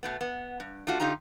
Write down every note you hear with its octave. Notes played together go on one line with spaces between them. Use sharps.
B2 A3 B3
B3
G2
A3 D4 F4 F#4
D3 D#4 F4 G4 A#5